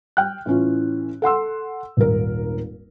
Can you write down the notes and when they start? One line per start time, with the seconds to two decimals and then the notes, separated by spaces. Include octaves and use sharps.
0.17 G5 F6 F#6
0.46 A2 E3 C#4 F4
1.22 A4 F#5 C6 E6
1.97 D#1 G#1 A#4